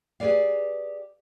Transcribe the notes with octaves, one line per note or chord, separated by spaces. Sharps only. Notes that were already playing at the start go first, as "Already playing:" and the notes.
G4 G#4 A#4 B4 D5 F5